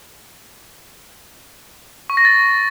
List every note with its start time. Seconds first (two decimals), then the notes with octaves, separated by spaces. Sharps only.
2.10 C#6
2.17 A#6
2.25 A6